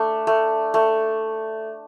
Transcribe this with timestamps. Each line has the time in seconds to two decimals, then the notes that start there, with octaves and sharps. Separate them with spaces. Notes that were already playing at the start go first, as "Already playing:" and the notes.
Already playing: A3 D4
0.27 A3
0.74 A3